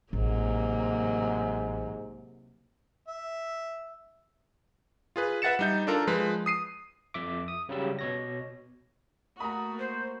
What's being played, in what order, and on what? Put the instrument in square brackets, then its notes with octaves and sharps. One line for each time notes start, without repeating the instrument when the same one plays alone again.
[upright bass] A1 [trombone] G#2 [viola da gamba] C3 F#3 A#3
[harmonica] E5
[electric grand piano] F4 G#4 B4
B4 E5 F#5 A6 C#7 E7
G3 D#4 G6
D4 F4 A4 A#4
F3 G#3 B4
D#6 C7 D#7
[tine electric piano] F2 E5 D6
D#6
C#3 F#3 G3 E6
B2 C#5 A#6
[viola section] A3 A#3 F#4 [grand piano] A#5 B5 [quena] D#6
[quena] C5